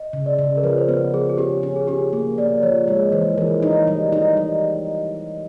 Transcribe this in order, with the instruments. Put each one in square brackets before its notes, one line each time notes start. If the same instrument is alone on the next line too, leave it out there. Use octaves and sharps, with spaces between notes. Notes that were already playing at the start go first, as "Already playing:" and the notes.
Already playing: [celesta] D#5
[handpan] C#3
[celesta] D5
[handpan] C#3
[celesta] A#4
[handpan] F3 [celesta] B4
[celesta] C5
[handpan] B3 [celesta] B4
[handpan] F3 [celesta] G#4
[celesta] G#4
[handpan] C#4 [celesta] G4
[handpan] C#4
[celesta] G#4
[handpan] C#4 [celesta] G4
[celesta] G#4
[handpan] A#3 [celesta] G#4
[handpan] A#3 [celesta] D5
[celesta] D5
[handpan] F3 [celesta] C#5
[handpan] G#3 [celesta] C#5
[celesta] B4
[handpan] E3 [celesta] C5
[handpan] E3 [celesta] A#4
[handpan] D#4
G3
D#4
G3